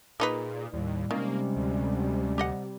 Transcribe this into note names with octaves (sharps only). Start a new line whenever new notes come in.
A#2 A#3 D#4 G#4 B4
D#2 A2 G3
C3 D#3 G3 G#3 A#3 C#4
D2
G4 D#5 F#5